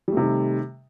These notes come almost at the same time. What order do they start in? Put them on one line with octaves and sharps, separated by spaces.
G3 A3 C3 D#3